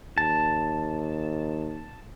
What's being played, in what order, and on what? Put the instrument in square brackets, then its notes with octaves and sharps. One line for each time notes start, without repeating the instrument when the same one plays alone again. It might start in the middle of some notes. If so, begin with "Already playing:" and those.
[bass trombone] D#2 [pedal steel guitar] A5